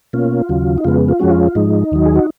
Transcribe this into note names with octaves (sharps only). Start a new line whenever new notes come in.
B2 A#3 C#4 F4
D#2 C#3 F#3
D#4
F2 C#3 G#3 B3 F4
F4
F2 F3 G#3 C#4 F#4
F4
G#2 F3 G#3 D#4
D#2 D#3 F#3
G#4
F#4